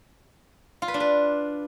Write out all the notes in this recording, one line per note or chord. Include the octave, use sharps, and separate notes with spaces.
F4
B4
D4
B4